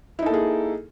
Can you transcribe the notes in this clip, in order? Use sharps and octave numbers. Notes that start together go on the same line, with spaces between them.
A#3 D#4 E4 G#4 A4